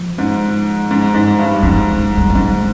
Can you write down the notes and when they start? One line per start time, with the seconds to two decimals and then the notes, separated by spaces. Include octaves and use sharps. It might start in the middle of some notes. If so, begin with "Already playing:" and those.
Already playing: F3
0.18 G#2
0.91 G#2
1.14 G#2
1.39 G2
1.63 G#2 F3
1.98 G3
2.17 G3
2.30 G3
2.35 G#2 G#3